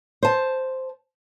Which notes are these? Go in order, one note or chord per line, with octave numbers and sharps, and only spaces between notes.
C5 A5